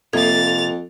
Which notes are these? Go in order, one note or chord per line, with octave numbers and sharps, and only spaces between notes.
F2 C3 A#3 A4 G#6 A6 F7